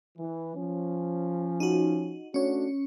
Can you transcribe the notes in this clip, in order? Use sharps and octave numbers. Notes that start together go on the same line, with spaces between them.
E3
F3 C#4
D#4 F#4
A3 C#4 D4 F#4 C#5